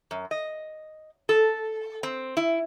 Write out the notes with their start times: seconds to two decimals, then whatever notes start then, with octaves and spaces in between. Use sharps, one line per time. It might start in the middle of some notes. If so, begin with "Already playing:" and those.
0.11 F#2
0.31 D#5
1.29 A4
2.03 C4
2.37 E4